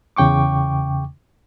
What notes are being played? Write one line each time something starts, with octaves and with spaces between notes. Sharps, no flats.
E2 C#3 G5 C#6 D6